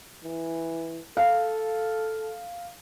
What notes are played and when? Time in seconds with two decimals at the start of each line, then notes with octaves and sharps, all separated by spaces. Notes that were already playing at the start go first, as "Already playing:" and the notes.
0.23 E3
1.17 A4 F5